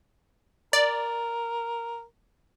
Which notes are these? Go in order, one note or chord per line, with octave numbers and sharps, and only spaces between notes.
A#4 D5